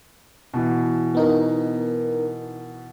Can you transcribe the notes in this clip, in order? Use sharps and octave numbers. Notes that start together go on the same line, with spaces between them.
B2 E3
B3 D#4 A#4